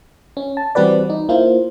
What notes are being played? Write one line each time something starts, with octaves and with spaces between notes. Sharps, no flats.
C#4
A5
E3 G3 C4 F#4 B4 D5
D#4
A#3 E4 F4 C5